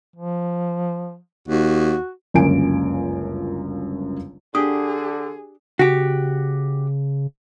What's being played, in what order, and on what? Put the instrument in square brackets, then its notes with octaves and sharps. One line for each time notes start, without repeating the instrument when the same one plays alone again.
[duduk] F3
[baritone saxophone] D#2 [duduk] F#4
[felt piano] G1 C#2 F#2 A#3 G#5 D7
[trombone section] D3 [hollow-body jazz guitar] D4 G4 G5 [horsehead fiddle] G#4 [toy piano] D#6
[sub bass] C#3 [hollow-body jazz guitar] F#4 G4